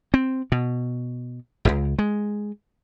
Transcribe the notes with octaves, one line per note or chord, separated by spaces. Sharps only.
C4
B2
D#1 C#2
G#3